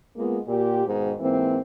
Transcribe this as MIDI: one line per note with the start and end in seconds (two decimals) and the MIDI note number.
0.16 0.38 56
0.16 0.38 58
0.16 0.38 59
0.16 0.38 65
0.48 0.85 46
0.48 0.85 67
0.87 1.13 44
0.87 1.13 47
0.87 1.13 51
1.19 1.58 44
1.19 1.58 52
1.19 1.58 58
1.19 1.58 60